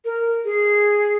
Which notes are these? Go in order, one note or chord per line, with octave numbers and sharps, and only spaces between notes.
A#4
G#4